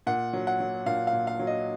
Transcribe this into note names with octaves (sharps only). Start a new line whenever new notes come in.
A#2 F#5
F#3
F#5
F#3
A#2 F5
F5
A#2
F5
F#3
D#5